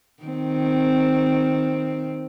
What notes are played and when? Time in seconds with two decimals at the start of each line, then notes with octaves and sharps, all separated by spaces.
0.23 D#3 C4